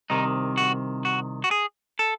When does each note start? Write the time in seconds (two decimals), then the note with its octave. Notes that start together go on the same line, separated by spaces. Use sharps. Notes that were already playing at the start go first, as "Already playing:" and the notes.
0.10 C2 C3 D#3 D#4
0.57 F#4
1.05 F#4
1.44 F#4
1.51 G#4
1.99 A4